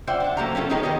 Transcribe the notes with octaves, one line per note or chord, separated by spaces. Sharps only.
F4 C5 D5 E5 F#5 G5
D4 F#5
F#3 A3 A#3 G4 C5 A#5
C#4 F4 G4 A4
B3 D#4 G4 G#4 A#4 C#5
D#3 B3 G4 G#4 D#5